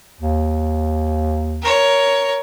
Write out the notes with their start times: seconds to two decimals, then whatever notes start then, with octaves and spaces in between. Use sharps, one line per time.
0.21 D#2
1.62 A#4 C#5